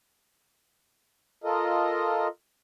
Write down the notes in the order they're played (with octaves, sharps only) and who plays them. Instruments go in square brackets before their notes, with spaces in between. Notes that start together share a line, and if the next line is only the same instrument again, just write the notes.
[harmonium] F4 A4 A#4 D#5